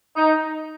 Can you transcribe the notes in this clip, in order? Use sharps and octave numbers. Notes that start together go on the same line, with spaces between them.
D#4